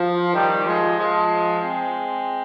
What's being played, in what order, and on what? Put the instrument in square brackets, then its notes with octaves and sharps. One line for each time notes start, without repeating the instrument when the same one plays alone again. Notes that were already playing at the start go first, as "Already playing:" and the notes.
Already playing: [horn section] F3
D#3 G3
F3 G#3
F3 G#3
G#3 C4